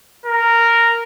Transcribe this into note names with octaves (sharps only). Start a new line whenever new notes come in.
A#4